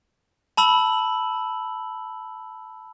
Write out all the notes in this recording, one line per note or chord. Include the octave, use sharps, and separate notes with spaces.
A5 B5 E6 F#7